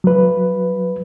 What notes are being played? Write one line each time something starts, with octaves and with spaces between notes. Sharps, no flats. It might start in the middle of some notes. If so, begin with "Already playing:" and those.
F#3 B4